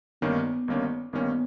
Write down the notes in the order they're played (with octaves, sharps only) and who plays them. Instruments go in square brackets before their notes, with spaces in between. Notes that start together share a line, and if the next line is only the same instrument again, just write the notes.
[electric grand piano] G1 G2 D#3 A#3 C#4 [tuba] B3
[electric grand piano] G1 G2 D#3 A#3 C#4
[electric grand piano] G1 G2 D#3 A#3 C#4 [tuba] B3